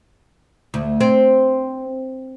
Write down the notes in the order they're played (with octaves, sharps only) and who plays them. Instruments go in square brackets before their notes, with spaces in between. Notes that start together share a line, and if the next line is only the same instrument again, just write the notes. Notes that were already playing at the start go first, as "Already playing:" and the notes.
[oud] D2
C4